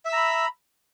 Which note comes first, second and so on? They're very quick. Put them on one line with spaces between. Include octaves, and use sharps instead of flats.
E5 E6 A#5 B5